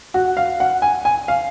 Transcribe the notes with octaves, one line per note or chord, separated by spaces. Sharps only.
F#4
F5
F#5
G#5
G#5
F5